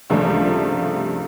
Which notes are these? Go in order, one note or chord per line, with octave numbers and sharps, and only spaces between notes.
C#2 G2 C3 F3 G3 A3